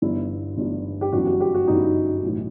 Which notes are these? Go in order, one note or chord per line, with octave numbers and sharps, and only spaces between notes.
G1 G2 E3 E4
G1 G2 E3
G4
G1 F#2 E3 F#4
F#4
G4
F#4
G1 F#2 E3 D#4
E4
D#4
B1 A2 E3